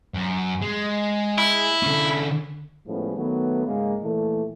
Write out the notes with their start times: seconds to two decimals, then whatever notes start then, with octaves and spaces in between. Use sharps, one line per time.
0.14 F#2
0.62 G#3
1.38 E4
1.83 D3 C#4
2.87 A2 F3 G3 G#3 B3 C#4
3.16 D#3 F#3 A3 B3
3.65 G#2 C#3 G#3 A#3
4.01 A#2 E3 A3